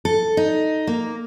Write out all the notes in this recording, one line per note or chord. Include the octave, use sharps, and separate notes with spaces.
A4
D#4
A#3